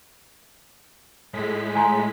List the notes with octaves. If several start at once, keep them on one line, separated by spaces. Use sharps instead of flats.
A2 G#3 B6
G#5 A#5 C6